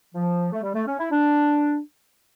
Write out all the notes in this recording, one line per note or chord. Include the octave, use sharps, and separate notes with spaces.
F3
A3
G3
A3
C#4
E4
D4